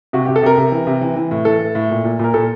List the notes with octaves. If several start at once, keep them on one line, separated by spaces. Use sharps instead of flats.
C3 F#4
G4
C3
A4
C3 A#4
C3
E3
C3
E3
E3
A2
E3 A4
A2
A2
A#2
A#2
A#2 A#4
A#2 A4